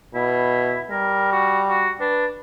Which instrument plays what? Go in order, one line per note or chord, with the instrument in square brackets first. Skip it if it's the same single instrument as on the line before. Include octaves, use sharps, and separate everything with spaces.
[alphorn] B2 [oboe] E4
[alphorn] G3 [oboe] A#4
[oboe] F#4
F#4
[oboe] D4 [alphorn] B4